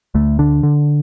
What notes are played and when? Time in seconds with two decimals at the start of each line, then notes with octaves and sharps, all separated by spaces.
0.15 D2 A3
0.39 D3 D4
0.63 D3